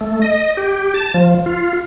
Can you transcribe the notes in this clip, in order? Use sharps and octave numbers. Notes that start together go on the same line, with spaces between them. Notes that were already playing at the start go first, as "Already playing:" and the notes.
A3
D#5
G4
A5
F3
F4